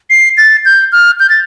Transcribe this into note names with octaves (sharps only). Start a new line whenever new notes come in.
C7
A6
G6
F6
G6
A6